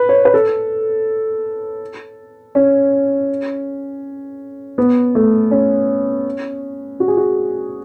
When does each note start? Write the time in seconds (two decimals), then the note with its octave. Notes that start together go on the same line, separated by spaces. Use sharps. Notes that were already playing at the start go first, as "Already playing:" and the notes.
Already playing: B4
0.09 C#5
0.25 B4
0.34 A4
2.55 C#4
4.78 B3
5.15 A3
5.51 C#4
7.00 F#4
7.08 G#4
7.17 F#4